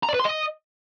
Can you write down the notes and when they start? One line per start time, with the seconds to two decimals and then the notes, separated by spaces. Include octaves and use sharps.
0.03 A#5
0.09 D5
0.14 B4
0.20 C6
0.25 D#5